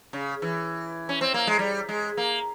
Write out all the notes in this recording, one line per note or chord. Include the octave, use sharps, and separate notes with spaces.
C#3
E3
C#4
C4
A#3
G#3
G3
G#3
A#3